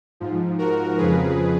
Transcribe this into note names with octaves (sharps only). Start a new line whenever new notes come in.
G#2 F3
F#4 A#4
F2 C#3 F3 G#4 B4